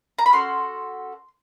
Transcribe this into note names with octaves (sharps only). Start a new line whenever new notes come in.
A#5
B5
C#4 F#4 A4 C6